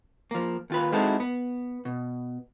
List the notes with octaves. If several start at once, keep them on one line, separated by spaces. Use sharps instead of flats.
F3 A#3
D#2 F4 B4
G#3 C4 D#4 E4 F#4 A4
B3
B2